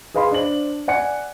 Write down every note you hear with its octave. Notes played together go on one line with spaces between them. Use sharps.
G#4 B4 D#5 F5 B5 C6
D4 C5 F#7
D5 F#5 G#5 C#7